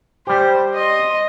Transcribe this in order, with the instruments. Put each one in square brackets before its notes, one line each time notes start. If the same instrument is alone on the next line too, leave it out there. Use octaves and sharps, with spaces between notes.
[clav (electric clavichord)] G3 G4 [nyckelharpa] C5
[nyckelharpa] D#5 C6